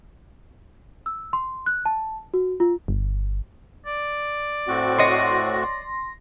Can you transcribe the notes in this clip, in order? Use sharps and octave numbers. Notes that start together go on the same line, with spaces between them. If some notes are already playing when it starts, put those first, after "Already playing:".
E6
C6
F#6
A5
F#4
F4
G1
D5
A2 C4 F#4
C#5 D#5 C6 A#6